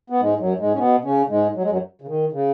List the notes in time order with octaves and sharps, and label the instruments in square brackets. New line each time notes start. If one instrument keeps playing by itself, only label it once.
[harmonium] B3
G#2 G#3
F#2 F#3
G#2 G#3
C#4
B2 B3
C#3 C#4
G#2 G#3
F#3
G#3
F#2 F#3
C#3
D#3
C#3